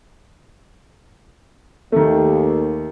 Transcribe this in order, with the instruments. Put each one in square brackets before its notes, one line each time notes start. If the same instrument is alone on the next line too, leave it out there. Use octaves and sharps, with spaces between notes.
[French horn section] D#2 [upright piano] D#3 A3